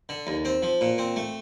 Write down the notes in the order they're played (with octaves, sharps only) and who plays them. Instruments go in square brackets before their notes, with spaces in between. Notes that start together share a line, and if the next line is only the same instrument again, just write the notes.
[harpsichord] D3
D#2
C4
F3
A#2
C4
A3